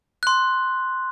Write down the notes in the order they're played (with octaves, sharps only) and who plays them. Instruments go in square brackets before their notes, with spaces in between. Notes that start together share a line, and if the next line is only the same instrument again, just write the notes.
[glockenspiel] C6 F#6